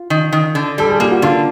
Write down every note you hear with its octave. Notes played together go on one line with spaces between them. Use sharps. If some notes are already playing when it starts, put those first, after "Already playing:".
Already playing: F4
D#3
D#3
D3
G3 A4
G#4
A#3 G4
F#4
D3 F4